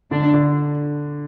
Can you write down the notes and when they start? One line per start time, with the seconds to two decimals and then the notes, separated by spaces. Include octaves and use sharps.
0.11 D3 D4
0.34 D3